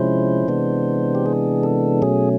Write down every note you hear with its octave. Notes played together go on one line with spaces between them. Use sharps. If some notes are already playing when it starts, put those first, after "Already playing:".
Already playing: C3 F3 G#3 C#4 E4 C5
C3 E3 G#3 B3 D4
G4
G#4
A4
B2 F#3 A3 C#4 G#4